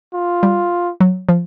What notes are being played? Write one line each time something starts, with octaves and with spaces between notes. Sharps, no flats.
F4
G3
F#3
F3